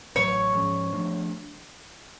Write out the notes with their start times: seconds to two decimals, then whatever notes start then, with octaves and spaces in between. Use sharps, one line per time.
0.15 A1 A2 F#3 C#5 C#6
0.54 G#2 F3 G#3 C#4
0.93 F3 A3 D4